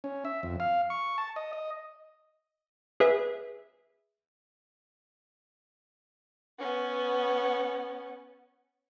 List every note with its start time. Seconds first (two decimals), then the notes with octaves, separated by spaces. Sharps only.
0.04 C#4
0.25 E5
0.43 F2
0.60 F5
0.90 C#6
1.18 A5
1.36 D#5
1.53 D#5
3.00 G#4 B4 E5
6.59 B3 C#4